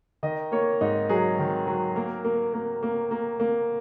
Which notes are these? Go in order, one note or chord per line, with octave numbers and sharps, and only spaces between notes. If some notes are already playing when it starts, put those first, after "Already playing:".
D#3 D#5
A#3 C#5
G#2 D#4
F#3 G#4
D#3
F#3
A#3 A#4
A#3
A#3
A#3
A#3
A#3